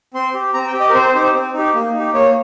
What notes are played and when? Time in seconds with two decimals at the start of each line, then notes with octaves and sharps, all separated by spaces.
0.14 C4 C6
0.34 G4
0.54 C4 A#5
0.67 G5
0.74 G4
0.80 D#5
0.89 A#4
0.94 C4 C5
1.15 D#4 G4
1.34 C4
1.54 D#4 G4
1.75 A#3
1.94 D#4 G4
2.14 A#3 C#5